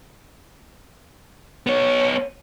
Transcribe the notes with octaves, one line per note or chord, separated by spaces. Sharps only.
B3 C#5